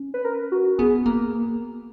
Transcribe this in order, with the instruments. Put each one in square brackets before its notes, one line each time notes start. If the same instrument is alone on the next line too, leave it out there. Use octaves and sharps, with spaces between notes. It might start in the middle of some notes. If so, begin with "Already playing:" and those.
Already playing: [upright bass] C#4
[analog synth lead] B4
A#4
F#4
[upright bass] B3 [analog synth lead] G#4
[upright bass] A#3